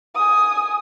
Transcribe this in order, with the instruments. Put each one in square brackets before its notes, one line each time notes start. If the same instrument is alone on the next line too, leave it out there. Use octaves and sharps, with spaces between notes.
[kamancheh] G#5 D#6